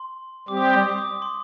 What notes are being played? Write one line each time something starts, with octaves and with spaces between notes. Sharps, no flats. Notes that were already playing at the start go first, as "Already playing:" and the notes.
Already playing: C6
G3 C4 G4 D6
D#6
D6
D#6
D6
D#6
D6
C6